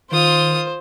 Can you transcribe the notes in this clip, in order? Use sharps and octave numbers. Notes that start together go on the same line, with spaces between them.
D#3 F4 C5 D#6